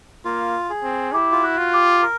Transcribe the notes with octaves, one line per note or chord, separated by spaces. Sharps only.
A#3 F4
G#4
C4
E4 G4
F4
F#4
F4
G4
A#4